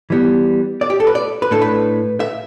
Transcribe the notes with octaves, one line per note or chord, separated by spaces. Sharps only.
E3 G3 B3
D5
G4
A4
B4
D5
B4
A2 A3 D4 A4
B4
E5